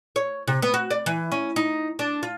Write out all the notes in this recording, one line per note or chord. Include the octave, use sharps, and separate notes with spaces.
C#5
C3
B3
F#4
D5
E3
C#4
D#4
D4
F4